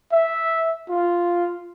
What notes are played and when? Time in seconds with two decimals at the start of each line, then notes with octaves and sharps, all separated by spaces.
0.12 E5
0.89 F4